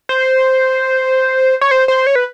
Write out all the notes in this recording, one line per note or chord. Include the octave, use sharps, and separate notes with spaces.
C5
C#5
C5
C5
C#5
B4